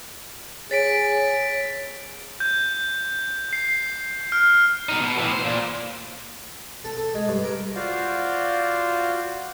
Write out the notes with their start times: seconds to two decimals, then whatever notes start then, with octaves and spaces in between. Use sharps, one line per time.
0.71 G#4 C#5 A6 B6 D7
2.40 G6
3.53 C7
4.32 F6
4.89 B2 D#4
5.01 B2
5.18 A2 E3
5.32 C5
5.45 A#2
6.84 A4
6.97 A4
7.14 G#3
7.28 G2
7.44 A#4
7.75 F4 F#4 C5 D5 F5